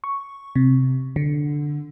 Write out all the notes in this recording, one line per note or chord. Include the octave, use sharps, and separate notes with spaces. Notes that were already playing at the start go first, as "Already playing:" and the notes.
C#6
C3
D3